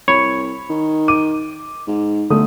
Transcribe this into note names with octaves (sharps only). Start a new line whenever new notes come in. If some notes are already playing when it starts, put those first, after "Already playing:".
C2 C#5 B5
D#3
D6 D#7
G#2
G1 D3 A3 D#6